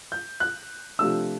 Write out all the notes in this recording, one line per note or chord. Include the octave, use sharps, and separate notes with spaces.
G6
F#6
C3 F3 A3 D4 E6